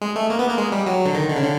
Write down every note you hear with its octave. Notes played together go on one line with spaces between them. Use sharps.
G#3
A3
A#3
B3
A#3
G#3
G3
F#3
D3
D#3
D3
C#3
D3